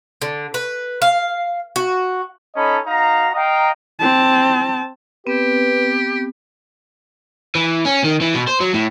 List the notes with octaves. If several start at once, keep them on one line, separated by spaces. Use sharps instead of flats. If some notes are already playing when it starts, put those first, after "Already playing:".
D3
B4
F5
F#4
C#4 D#4 A4 D#5 A5 B5
D#4 F#4 F5 A#5
D#5 F5 G5 A#5
C4 A5
B3 C4 G4 B4
E3
C#4
D#3
E3
B2
C5
F#3
A2